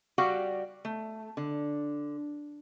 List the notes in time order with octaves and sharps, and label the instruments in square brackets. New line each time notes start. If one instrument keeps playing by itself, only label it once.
[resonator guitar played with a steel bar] G3 F#4 G4 D5 F5 F#5
A3
D3